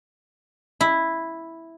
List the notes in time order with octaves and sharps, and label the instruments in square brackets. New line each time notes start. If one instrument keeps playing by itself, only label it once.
[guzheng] E4